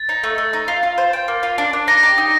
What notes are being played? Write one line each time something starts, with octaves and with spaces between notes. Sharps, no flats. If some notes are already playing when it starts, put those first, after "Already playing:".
Already playing: A6
D#4
A3
A3
D#4
F4
F4
C5
G5
A#3
F4
D4
D4
D#4 A#6
G4
D#4